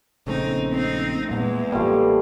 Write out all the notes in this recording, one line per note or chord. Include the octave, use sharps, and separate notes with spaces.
A#1 C#3 A3 C4 D#4
C4 D#4
E2 A#2 G#3
A1 G3 A3 A#3 F4